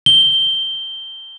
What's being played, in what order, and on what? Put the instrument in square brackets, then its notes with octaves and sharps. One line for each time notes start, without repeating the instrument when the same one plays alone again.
[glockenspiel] G7